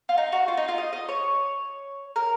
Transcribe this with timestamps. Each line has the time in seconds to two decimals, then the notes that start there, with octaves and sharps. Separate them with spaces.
0.09 F4
0.18 D#4
0.32 F#4
0.48 F4
0.57 D#4
0.68 F4
0.78 D#5
0.93 D#5
1.09 C#5
2.16 A#4